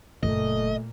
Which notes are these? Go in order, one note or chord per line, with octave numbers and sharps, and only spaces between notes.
F#1 A#2 F#3 A3 D#5